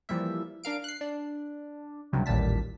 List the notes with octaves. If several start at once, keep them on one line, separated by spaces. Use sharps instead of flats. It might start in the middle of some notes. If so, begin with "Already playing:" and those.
E3 F3 G3 A#3 E5
D4 A#4 F5 D7
F#6 C7
D4
C#2 G2 C3 F#3
A1 D#2 A#2 G3 A5 B6